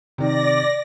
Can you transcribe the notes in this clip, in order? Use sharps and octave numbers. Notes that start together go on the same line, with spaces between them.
C3 D#3 D5 A#6